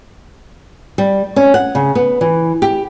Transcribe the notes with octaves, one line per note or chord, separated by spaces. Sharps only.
G3
C#4
F#5
C#3
B3
E3
G4